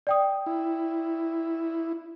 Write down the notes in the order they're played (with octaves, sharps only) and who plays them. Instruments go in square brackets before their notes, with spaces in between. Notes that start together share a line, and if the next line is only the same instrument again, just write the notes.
[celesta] D5 G5 D#6
[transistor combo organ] E4